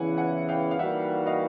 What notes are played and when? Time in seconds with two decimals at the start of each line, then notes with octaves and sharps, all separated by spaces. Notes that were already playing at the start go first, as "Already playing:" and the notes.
Already playing: E2 C#3 E3 F#5 G#5
0.17 F#5 G#5
0.49 F5 G5
0.71 F5
0.79 E3 G3 A#3 D#4 F#4 E5 F#5
1.26 D#5 F5